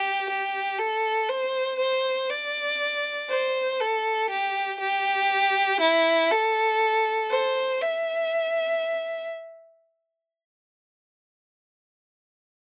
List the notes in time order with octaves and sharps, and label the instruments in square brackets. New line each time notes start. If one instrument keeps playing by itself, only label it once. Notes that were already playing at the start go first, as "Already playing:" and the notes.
Already playing: [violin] G4
G4
A4
C5
C5
D5
C5
A4
G4
G4
E4
A4
C5
E5